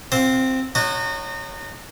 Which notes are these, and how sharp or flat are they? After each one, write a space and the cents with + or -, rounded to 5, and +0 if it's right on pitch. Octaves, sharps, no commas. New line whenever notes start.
C4 +0 F4 +30 C5 +0
D#4 -35 F#4 -15 C#5 +0